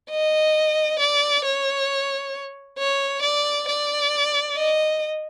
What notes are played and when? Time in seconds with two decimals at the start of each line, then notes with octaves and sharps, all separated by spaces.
0.10 D#5
0.99 D5
1.45 C#5
2.78 C#5
3.22 D5
3.68 D5
4.57 D#5